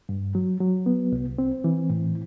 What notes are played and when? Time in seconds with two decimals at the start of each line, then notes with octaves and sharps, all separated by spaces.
0.09 G2
0.35 F#3
0.61 F#3
0.86 B3
1.12 C2
1.38 C4
1.64 E3
1.90 A2